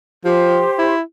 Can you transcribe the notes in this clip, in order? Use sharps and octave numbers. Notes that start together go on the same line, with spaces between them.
F3 G4 C5
E4